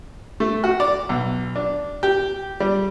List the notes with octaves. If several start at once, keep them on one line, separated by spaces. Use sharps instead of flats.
A3
F#4
D5
B1
D4
G4
G3